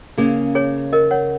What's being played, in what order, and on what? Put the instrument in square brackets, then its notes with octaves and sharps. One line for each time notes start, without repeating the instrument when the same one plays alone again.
[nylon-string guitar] C#3 A#3 C#4 [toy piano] G#4
[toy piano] G#4 C#5
A#4 D#5
C#5 F#5